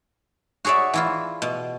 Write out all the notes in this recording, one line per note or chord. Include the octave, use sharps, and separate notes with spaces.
F#4 G#4 C#5 D5 E5
E3 E4 F4
B2